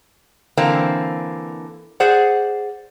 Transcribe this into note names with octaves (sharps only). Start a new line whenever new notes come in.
D3 E3 A#3 C4
G#4 C5 D5 F#5